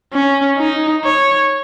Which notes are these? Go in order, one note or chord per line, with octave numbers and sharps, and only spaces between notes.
C#4
D#4
C#5